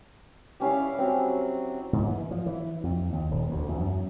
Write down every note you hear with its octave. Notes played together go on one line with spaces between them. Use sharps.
G3 C#4 E4 F5
F#3 C4
G#2
E3
F3
E3
F2
D#2
D#1
D2
E2
F#2